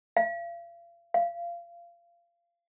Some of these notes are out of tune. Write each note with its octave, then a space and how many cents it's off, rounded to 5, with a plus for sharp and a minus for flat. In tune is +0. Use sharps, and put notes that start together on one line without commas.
F5 -40
F5 -25